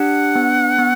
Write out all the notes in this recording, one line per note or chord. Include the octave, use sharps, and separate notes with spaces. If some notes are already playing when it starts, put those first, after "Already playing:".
Already playing: D4 G4 F#5
B3
B3